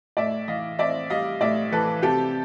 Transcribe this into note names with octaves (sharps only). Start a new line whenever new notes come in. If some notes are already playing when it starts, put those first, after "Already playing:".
A2 D5 E5
E3 D#5 F5
C4 D5 E5
G3 D#5 F5
A2 D5 E5
E3 A4 B4
C3 G4 A4